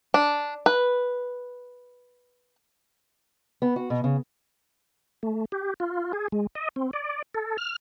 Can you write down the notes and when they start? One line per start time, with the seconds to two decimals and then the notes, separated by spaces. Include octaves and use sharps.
0.14 D4
0.66 B4
3.62 B3
3.76 F#4
3.90 B2
4.04 C#3
5.23 A3
5.52 G4
5.80 F4
6.13 G#4
6.32 G#3
6.55 D#5
6.76 C4
6.93 D5
7.35 A4
7.58 F6